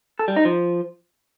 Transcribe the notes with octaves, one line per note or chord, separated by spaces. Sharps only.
A4
G3
D#4
F3